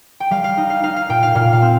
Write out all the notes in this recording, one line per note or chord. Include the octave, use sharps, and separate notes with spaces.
G5
G3 F5
F5
D#4
F5
D#4 F5
F5
A#2 G5
F5
A#2 F5
F5
C4